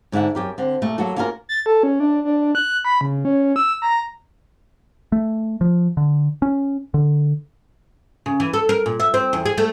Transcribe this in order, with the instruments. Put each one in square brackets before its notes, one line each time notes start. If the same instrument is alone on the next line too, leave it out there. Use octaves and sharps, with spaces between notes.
[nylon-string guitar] G#2 D3 F4 E5 F#5
F#2 G4 A#4
D3 C4 D4
A#2 A3
F#3 A#3 F#4 A4
A#3 C#4 F4 F#4 G#4 A#4
[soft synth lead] A6
A4
C#4
D4
D4
F#6
B5
C#3
C#4
E6
A#5
[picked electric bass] A3
F3
D3
C#4
D3
[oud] C#3
E3
A4
A#4
A#2
E5
C4
E2
G#4
A3